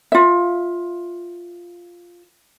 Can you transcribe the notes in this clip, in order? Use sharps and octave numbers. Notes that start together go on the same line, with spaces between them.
F4 E5